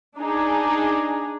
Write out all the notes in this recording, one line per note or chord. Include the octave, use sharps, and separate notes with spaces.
D4 D#4 G#4